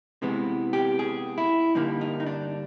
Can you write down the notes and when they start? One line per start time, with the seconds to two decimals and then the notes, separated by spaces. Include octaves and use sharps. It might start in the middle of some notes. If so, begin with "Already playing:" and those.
0.22 C3 E3 G#3 B3
0.73 G4
0.99 G#4
1.38 E4
1.75 G2 D3 G3 A#3 D#4
2.01 D#4
2.20 D#4
2.26 D4